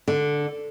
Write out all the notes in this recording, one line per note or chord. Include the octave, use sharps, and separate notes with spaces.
D3